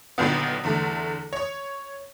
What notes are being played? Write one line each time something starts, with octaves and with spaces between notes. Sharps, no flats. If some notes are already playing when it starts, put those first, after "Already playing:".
B1 A#2 D3 D#3 B3
E2 D3 A3
C#5 C#6